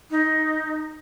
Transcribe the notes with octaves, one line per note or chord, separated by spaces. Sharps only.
D#4